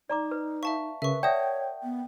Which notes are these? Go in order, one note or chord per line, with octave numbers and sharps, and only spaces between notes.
D#4 D5 A#5 D6
B4
E5 F5 A5 C#6
C#3 A#4 B4 E5 C#6
C#5 D5 E5 F#5 G5 A5 D#6
B3